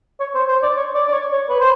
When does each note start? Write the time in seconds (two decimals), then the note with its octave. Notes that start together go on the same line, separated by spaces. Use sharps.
0.20 C#5
0.35 C5
0.48 C5
0.63 D5
0.77 C#5
0.95 D5
1.08 D5
1.13 C#5
1.32 C#5
1.49 B4
1.60 C5